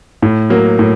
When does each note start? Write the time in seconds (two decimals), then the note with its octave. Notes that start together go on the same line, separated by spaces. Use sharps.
0.22 A2
0.50 F#3 A#3
0.79 A2